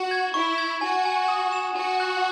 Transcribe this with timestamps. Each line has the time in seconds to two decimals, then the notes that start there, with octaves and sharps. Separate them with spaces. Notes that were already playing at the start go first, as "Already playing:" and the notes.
Already playing: F#4
0.11 G#6
0.34 E4 C#6
0.58 G#6
0.81 F#4 G#5
1.05 G#5
1.28 D#6
1.52 E7
1.75 F#4 G#5
2.00 F#6